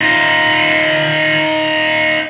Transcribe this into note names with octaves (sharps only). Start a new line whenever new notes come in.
D#4 F4